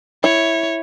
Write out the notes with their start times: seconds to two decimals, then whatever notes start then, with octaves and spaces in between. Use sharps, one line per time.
0.24 E4 C#5